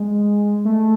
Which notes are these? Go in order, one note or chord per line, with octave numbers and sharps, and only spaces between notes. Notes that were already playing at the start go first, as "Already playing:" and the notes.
Already playing: G#3
A3